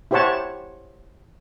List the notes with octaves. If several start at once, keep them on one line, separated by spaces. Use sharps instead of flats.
E4 G4 C5 C#5 F#5 A5